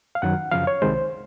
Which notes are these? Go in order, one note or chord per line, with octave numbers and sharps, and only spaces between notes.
F5
F#2 D#3 F#3 F#5
F#2 C#3 F3 F5
C#5
C2 C3 D#3 G#3 C5